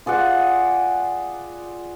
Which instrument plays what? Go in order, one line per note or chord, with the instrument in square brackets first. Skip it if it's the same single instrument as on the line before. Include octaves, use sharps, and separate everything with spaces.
[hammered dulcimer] F4 G#4 D5 F#5